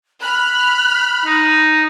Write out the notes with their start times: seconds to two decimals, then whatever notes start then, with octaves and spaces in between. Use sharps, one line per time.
0.21 B5 F6 F#6
1.25 D#4